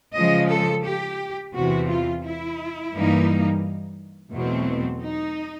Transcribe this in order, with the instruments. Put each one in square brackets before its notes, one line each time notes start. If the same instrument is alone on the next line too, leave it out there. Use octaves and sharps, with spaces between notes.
[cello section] C#3 F3 G#3 D#5
A4
G4
E2 C3 E3 F#4
F4
E4
G2 E3 G3 A#3 D#4
E2 B2 F#3 A3 C4
D#4